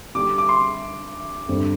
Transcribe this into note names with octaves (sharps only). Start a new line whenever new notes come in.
D3 G3 D4 G4 D6
D6
C6
G2 D3 G3 C4